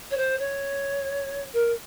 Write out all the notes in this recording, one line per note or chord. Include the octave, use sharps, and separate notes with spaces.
C#5
C5
C#5
A#4